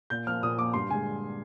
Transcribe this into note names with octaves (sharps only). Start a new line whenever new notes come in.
A#2 G6
F3 A#3 F6
A#2 D#6
F3 A#3 D6
G2 C6
D3 G#3 G#5